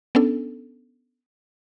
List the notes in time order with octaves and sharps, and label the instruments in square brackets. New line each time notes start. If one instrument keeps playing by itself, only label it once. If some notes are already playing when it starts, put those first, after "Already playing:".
[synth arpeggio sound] B3 C#4 D4 A4